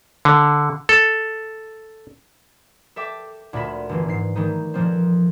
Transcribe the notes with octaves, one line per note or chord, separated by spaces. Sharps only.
D3
A4
A4 E5 G5 D6
D2 A#2 F4 E5 B5 A#6
G1 E3 C7
G#2 C7
D#3 E3 G3 A3 D#4
F2 A#2 F3 C4